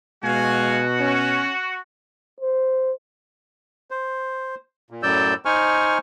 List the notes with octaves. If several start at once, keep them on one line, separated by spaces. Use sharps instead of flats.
B2 G#3 F#4 F5 G#5
C#4
C5
C5
A#2
F#2 A2 F#3 D5 E6 G6
D#4 C5 G#5 C#6 F6